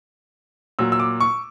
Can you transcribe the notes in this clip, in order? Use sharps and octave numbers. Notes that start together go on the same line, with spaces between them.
A#2 F#3 E6
E6
D6
C#6